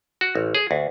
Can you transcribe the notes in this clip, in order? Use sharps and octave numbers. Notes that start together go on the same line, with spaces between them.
F#4
A1
G#4
D2